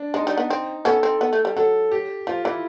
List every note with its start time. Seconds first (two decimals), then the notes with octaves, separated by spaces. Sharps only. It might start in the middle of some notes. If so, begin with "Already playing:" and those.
Already playing: D4
0.14 G#3 D#4
0.27 G3
0.37 B3
0.50 C4
0.85 B3 C#4 A4
1.03 C4
1.21 B3
1.33 A3
1.45 G3
1.57 F#3 A4
1.92 G4
2.27 F3 F4
2.45 E3 E4